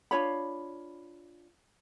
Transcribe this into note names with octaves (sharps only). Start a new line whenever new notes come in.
D4 F4 C#5 B5